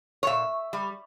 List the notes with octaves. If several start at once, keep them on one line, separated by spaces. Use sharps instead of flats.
C#5
A#2 E5
G3